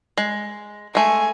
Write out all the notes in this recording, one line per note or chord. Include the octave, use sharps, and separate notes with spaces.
G#3
G#3 A3 G#5